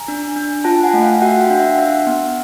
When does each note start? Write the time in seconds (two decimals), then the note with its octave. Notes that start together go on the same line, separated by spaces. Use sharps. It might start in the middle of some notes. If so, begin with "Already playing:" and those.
Already playing: G#5 A#5
0.08 D4
0.36 D4
0.64 F4 G5 A5
0.84 F#5 G#5
0.93 A3
1.02 F5 G5
1.22 F#4 E5 F#5
1.41 F5 G5
1.50 D4
1.59 E5 F#5
1.78 D4 E5 F#5
2.07 B3